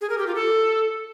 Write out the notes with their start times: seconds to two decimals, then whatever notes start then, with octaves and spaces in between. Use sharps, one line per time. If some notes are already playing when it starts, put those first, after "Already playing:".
0.01 G#4
0.10 A#4
0.18 G4
0.27 F4
0.35 A4